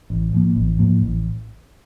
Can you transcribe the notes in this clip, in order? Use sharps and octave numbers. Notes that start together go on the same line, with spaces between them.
A1
A2 F3 A#3
A1
A2 F3 A#3
A1